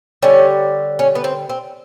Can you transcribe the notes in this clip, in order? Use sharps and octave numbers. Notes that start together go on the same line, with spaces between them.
D3 G3 C#4
C#4
B3
C4
C4